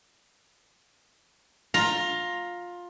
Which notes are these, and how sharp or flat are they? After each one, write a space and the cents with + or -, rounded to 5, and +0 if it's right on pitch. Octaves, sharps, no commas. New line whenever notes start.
F4 +15 A#5 +0